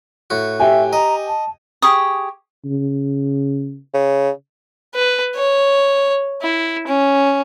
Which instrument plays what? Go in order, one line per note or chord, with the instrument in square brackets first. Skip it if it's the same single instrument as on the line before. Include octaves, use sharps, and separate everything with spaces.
[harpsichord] A2 F#4
[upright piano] G4 G5 G#5 [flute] E5
[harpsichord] D#5 [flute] A#5
[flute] A5
[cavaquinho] G4 G#4 C#6 D#6
[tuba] C#3
[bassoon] C#3
[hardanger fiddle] B4
C#5
E4
C#4